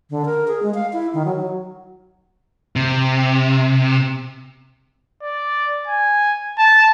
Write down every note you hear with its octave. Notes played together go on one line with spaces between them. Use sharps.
D3
A#4
G#4
G#3
F5
E4
D#3
F#3
F#3
C3
D5
G#5
A5